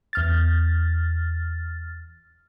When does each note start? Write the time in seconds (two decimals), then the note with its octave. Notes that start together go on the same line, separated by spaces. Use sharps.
0.13 E2 F6 A6